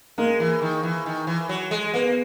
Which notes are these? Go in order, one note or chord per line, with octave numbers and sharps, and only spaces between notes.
G#3 A#3
E3
D#3
E3
D#3
E3
F#3
G#3
A#3 B3